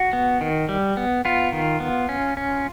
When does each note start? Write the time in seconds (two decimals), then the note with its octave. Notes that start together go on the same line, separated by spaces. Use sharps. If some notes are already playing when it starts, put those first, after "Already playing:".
Already playing: F#4
0.13 B3
0.41 D#3
0.69 G3
0.97 B3
1.25 B3 F4
1.52 D#3
1.80 B3
2.09 C#4
2.37 C#4